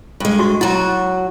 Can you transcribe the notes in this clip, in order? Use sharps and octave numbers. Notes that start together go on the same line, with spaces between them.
G2 G#3
F#4 C#6
F#3 E4 F#4